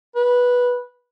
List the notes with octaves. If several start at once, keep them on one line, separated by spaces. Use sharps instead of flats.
B4